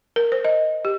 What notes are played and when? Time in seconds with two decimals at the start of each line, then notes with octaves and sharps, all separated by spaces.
0.16 A#4
0.32 C5
0.45 D#5
0.85 G4